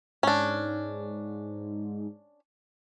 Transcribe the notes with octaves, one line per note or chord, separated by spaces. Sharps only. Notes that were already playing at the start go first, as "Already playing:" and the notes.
G#2 C#4 D4